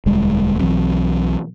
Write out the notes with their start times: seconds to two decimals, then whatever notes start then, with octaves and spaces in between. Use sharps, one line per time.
0.06 E1 D2 G3 G#3
0.60 B1 E3 F#3 C4